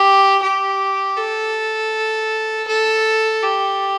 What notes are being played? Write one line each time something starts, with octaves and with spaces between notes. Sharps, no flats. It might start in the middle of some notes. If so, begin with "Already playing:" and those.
Already playing: G4
G4
A4
A4
G4